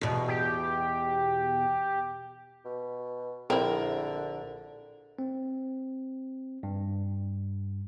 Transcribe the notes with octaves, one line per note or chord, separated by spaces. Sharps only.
E2 B2
G4
B2
A#1 D3 C4 E4 A#4
C4
G2